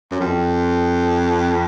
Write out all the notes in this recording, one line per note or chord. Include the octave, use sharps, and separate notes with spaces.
F#2
F2